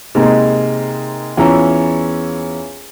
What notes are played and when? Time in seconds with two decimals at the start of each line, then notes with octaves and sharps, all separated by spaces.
0.15 G#2 C3 A#3 D#4
1.37 E2 C#4 E4 F4 A#5